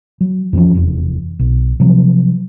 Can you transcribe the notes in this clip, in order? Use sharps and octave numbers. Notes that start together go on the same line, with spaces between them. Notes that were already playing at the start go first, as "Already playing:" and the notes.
F#3
F2 E3 F3 C#4
F1 E2
B1
C3 F3 F#3